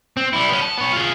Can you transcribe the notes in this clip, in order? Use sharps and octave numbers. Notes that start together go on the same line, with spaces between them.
C4
G3 E4
B3 C#4
A5
B3 C#5
F4 G#4